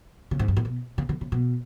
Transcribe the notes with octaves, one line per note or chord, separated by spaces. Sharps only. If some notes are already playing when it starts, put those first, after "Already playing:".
C#3
G#2
G2
A2
B2
C#3
D3
C#3
B2